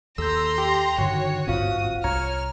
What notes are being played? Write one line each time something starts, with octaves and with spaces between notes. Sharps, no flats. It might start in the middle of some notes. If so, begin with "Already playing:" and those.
D#2 A4 A#5 C6 E6 G6
G4 G5
G2 D3 D#3 F#4 C#5
D1 G#1 G2 C4 F4 F5 D#6
C2 C#5 A#5 F6